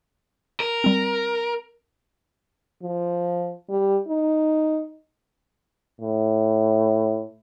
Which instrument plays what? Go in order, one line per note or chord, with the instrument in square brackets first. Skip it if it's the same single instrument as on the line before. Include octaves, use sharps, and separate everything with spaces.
[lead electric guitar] A#4
[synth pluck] G3 C4
[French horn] F3
G3
D#4
[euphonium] A2